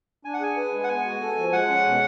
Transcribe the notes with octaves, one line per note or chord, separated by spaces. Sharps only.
D4 G#5
F#5
G#4 G#5
B4
G#3
F#5
B3 G#5
F#4
A4
F3
G#3 F#5
C#4
B2